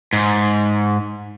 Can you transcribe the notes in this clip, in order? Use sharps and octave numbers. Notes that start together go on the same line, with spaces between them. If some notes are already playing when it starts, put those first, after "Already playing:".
G#2